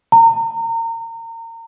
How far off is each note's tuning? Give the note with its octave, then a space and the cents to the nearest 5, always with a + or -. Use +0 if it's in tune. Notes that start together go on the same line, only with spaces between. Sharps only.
A#5 -30